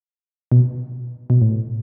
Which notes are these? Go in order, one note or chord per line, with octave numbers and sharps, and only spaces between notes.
B2
B2
A2